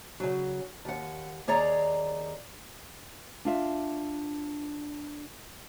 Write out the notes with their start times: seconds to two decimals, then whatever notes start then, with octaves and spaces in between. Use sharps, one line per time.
0.20 C#3 F#3
0.85 D#2 F#5
1.48 D#2 G#4 C#5 D5 A#5
3.45 D4 F4 E5